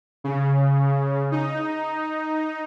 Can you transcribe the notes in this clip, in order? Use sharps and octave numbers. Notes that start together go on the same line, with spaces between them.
C#3
D#4